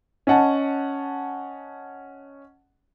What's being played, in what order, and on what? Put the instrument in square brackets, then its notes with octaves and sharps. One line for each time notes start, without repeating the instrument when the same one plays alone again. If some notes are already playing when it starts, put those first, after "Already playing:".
[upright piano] C#4 D#5 F#5 A5